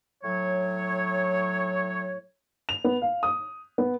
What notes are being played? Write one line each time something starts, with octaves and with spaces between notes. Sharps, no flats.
A2 F#3 C#5
F7
B3
F5
D#6
B3